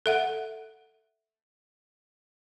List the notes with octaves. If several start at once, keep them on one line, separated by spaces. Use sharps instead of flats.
A4 E5 F#5